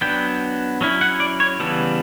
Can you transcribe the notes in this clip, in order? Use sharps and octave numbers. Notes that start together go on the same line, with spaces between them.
F#3 B3 D4 G5
F#3 C#4 E4
F#5
D5
C#5
C#3 E3 G3 B3 A4